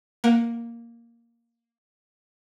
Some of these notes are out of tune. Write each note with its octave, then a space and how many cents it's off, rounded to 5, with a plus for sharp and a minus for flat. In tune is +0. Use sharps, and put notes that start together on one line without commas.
A#3 +0 A#4 +20 F#5 +0